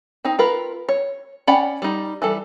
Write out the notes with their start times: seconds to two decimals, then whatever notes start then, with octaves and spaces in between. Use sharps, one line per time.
0.25 C4 D#4
0.39 F4 A#4 B4
0.89 C#5
1.47 C#4 D5 F#5 G5 B5
1.82 G3 D#4
2.22 E3 G3 A4